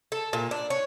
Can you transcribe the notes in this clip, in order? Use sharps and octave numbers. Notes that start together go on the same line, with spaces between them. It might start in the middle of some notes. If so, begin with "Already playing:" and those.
A4
A#2
D4
C#5